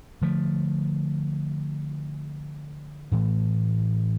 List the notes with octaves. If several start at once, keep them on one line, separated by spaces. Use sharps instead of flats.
D3 F3 A3
A2 E3 A3